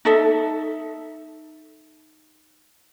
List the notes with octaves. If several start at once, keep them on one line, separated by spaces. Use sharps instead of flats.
D#4 A4 E5